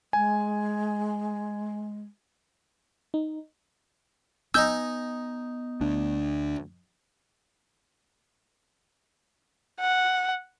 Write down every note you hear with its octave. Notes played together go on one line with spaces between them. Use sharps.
G#3 G#5
D#4
B3 D#4 D#5 G#5 E6 G6
D2 D4
F#5